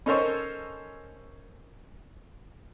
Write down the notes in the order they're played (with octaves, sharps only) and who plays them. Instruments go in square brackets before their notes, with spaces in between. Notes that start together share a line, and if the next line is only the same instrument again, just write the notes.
[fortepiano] C#4 D#4 A4 A#4 C5 C#5